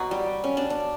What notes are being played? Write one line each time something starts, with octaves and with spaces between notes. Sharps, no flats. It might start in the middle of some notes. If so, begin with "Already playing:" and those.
Already playing: B2 F#3 B3 F#4
G3
C#4
D4
D4